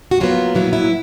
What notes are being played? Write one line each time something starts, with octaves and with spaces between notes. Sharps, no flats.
F#4
A#2 F#3 B3 F4
A#2 F#3 B3 E4
E4